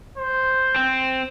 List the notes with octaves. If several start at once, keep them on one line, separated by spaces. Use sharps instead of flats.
C5
C4